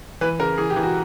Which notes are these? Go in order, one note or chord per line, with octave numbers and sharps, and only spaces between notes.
E3 B4
C#3 A#4
E3 G#4
G4
E3
F#4